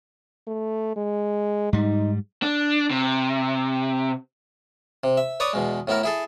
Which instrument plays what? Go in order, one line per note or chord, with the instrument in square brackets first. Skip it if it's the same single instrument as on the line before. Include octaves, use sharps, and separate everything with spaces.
[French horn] A3
G#3
[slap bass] G#2 G3 [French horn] D#4
[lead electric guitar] D4
C3
[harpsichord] C3
E5
B4 C#5 D5 D#6
E2 B2 G#3
A2 B3 E4 A#4
E4 G#4 A4